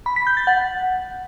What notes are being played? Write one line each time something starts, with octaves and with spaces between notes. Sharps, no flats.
B5
B6
G6
A6
F#5